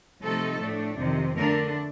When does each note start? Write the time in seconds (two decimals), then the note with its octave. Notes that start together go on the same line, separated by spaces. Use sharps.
0.22 C3 F3 A3 D#4 A4
0.60 A2 A3 D4
0.98 F2 C3 D#3
1.37 D3 A3 D4 A#4